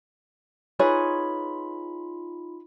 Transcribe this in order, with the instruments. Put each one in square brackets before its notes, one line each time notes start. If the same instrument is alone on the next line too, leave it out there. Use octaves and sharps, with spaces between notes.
[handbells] D#4 F4 B5 [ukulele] G#4 B4 C#5